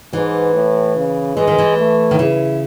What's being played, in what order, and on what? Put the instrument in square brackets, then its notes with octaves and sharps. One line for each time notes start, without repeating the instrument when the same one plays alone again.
[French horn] G#2 [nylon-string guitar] E3
[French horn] A2
C#3
[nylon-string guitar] E3 [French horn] G#3
[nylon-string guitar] D#3
E3
[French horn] A3
[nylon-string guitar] D#3
[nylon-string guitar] C#3 [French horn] E4